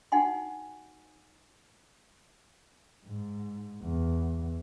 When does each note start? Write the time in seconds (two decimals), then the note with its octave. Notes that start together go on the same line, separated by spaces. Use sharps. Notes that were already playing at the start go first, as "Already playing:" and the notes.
0.12 D#4 F#4 F#5 G#5 C6
3.06 G#2
3.82 E2